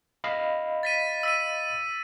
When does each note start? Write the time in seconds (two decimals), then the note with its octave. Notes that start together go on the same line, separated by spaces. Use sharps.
0.24 D#5 F5 B5
0.83 A6 B6 D#7
1.23 E6 B6 D#7